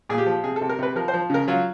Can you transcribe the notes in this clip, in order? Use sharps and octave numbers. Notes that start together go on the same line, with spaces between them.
A#2 G#4
G4
F3
C3 G#4
A4
C3
A#4
C3 B4
F3 A#4
C5
F3
C#3 A#4
F#3 F4